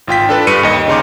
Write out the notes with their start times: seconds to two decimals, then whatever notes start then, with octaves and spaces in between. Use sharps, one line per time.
0.08 G#1 F4 G5 B6
0.29 D4 A4 B4
0.47 G2 C#7 D#7
0.63 D#2 D#5
0.88 C#3 D#4 C6 D6